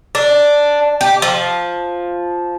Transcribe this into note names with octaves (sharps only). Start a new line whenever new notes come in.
D4
G4
F3